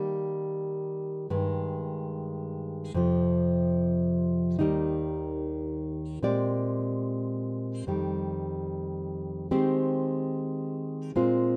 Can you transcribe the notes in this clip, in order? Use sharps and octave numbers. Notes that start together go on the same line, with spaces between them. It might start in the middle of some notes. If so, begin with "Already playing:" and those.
Already playing: D#3 G3 A#3
G2 D#3 G#3
F2 C3 F3
D#2 D#3 G3 A#3 D#4
A#2 G#3 C4 G4 D5
F2 D#3 G3
D#3 G#3 C4 G4 C5
A#2 G#3 C4 F4